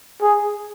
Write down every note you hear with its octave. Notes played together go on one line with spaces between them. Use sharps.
G#4